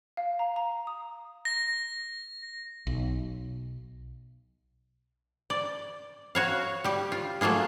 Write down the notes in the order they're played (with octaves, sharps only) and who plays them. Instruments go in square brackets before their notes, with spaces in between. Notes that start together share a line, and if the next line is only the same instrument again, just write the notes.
[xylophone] F5
A#5
A#5
D#6
[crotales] A#6
[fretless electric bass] B1
[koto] D5
F#4 C#5 F5
G3 G4
F4
F#3 A3 A#3 F4 G#4